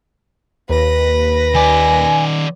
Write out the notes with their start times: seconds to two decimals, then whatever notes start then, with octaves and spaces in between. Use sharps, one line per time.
0.69 D#2 B4 A#6
1.54 D#3 D5 G#5